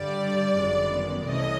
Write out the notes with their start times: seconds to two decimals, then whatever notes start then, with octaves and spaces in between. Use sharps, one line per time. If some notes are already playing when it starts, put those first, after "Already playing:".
Already playing: G2 D3 G3 D5
0.57 G1 F#2 D#3 G#3 B3
1.27 C2 C3 E3 A3 C#4 D#5